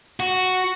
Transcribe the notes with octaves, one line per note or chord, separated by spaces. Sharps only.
F#4